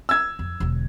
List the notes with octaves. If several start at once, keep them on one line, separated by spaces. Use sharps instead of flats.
E6 G#6
F2
E1 D3